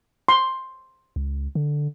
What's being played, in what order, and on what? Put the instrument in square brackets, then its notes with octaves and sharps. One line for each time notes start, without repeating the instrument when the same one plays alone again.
[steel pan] C6
[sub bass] C#2
D3